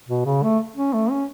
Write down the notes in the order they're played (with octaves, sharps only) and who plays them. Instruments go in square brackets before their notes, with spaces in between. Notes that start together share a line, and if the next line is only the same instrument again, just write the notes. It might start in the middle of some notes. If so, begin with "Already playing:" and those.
[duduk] B2
C#3
A3
C#4
A3
C#4